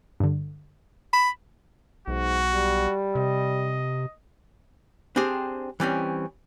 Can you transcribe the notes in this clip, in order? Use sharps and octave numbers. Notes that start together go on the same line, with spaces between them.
G2 D3
B5 E7
B1 G#2 F#4
G3
C3 D#5
C4 D4 G4 G#4 C5
E3 G3 C4 C#4